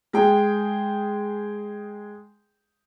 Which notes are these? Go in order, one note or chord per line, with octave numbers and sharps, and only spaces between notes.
G#3 G#4 G5